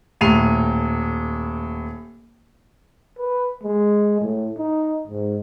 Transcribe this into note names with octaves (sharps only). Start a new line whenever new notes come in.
D#1 A2 C7 D#7 F7
B4
G#3
A2
D#4
G#2